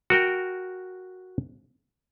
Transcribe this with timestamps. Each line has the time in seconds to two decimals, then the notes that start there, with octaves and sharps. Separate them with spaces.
0.10 F#4 A#4 G5